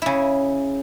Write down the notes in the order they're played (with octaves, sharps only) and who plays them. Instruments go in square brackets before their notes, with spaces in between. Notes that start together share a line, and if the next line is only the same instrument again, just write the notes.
[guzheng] C#3 E4